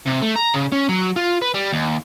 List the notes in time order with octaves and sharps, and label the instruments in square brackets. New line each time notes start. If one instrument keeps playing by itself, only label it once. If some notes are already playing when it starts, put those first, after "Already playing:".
[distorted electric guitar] C3
A3
A#5
C#3
C#4
F#3
F4
B4
G3
D#2